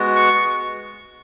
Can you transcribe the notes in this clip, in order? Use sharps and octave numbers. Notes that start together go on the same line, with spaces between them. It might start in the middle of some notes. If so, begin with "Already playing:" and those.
Already playing: G#3 B3 F#4
C#6